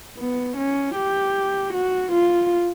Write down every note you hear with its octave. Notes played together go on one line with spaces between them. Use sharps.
B3
C#4
G4
F#4
F4